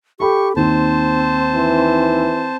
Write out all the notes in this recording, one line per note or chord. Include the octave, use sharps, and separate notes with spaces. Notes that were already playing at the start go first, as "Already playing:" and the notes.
G4 A4 B5 C#6
D#2 C4 D#4 C5 A5
E3